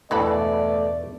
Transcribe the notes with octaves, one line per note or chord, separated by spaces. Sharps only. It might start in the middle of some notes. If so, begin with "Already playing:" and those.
E2 G2 B2 E3 A3 A4 D5 B5